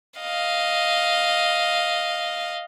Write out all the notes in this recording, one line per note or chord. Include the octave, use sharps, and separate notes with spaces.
D#5 F5